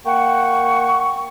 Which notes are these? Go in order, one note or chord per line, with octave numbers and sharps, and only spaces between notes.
A#3 F#5 G5 C#6